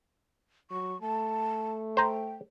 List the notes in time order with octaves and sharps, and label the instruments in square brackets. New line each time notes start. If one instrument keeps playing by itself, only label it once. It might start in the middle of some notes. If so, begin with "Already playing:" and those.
[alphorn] F#3 [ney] C#6
[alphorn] A3 [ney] A5
[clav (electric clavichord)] C5 A#5 [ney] G5